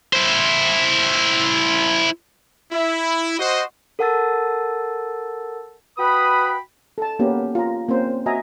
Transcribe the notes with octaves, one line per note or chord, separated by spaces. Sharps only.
E4 C5
E4
F#4 C5 D#5
A4 A#4 F#5 A5 E6 A6
F#4 B4 G5 B5 D#6
A4 A5
A#3 B3 C#4 G4
F4 A#5
A#3 C4 C#4 C5
F#4 D#5 E5 G#5 A#5